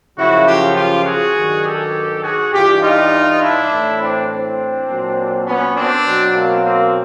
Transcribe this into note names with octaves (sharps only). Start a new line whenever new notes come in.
F#2 C#3 F3 E4 F#4
F4 G4
F4 G4
F#4 G#4
G2 D#3 F#3
G4 A4
F#4 G#4
G2 E3 F4 G4
D#4 F4
D4 E4
A2 E3
C4 D4
C4 D4
A#2 F#3
B3 C#4
C4 D4
B2 F#3
A#3 C4
A#3 C4